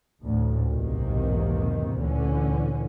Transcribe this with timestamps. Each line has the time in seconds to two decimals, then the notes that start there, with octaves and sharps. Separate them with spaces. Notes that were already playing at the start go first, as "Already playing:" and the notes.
0.23 A1 D2 A2
0.69 B1 E2 G#2 C3 D#3 A#3
1.99 D2 A#2 D3 E3 C#4